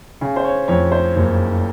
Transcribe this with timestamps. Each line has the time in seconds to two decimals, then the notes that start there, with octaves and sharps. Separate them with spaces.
0.21 C#3
0.36 C5
0.45 C#5
0.68 F2 C#5
0.92 C5
1.16 F#1